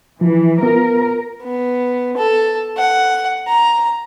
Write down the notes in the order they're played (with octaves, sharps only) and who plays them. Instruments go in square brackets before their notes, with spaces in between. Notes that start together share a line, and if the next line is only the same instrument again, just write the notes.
[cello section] E3 [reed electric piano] F3
[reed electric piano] B3 F4 [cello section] A#4
[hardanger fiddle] B3
A4
F#5
A#5